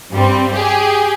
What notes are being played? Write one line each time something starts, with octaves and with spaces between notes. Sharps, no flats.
G2 G3 C4
G4 G#4